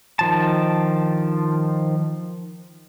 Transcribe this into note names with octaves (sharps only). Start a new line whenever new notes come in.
D#3 F3 A5